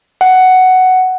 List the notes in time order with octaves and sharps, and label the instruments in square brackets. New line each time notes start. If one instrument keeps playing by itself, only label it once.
[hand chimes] F#5